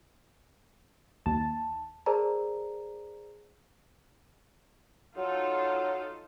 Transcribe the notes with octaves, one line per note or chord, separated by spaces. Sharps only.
D#2 A5
G#4 A#4 C5 D5 A5 A#5
F#3 D#4 F4 A4